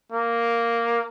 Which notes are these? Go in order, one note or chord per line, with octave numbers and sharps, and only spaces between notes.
A#3